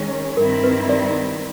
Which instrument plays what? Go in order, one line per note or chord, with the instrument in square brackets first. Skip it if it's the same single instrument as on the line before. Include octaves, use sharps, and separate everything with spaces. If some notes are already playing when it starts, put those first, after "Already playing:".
Already playing: [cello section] D#3 G#3 C#4
[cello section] G2 D#3 G3 C4 E4 [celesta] A#4
[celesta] B4
D5